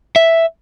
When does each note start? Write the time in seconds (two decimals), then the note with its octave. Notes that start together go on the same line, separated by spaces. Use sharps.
0.16 E5